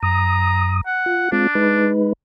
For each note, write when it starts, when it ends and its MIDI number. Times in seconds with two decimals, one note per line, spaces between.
0.03 0.81 42
0.03 0.81 82
0.03 0.81 87
0.86 1.28 78
1.06 1.29 65
1.32 1.47 56
1.32 1.47 60
1.32 1.90 62
1.32 1.47 65
1.55 2.13 56
1.55 2.13 63
1.55 2.13 71